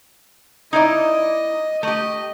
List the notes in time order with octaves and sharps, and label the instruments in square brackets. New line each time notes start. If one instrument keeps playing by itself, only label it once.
[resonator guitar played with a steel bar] D#4 E4 D5 [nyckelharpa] D#5
[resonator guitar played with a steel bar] A3 G4 [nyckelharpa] D#5